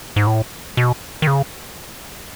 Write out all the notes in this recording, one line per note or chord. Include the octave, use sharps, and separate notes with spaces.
G#2
A2
B2
D#3
C#3